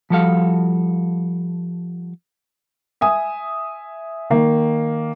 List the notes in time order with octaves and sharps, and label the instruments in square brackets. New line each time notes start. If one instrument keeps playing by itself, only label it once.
[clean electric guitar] F3 G3 F#4 A4 F5
[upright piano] E5 G#5 D#6
D#3 A#3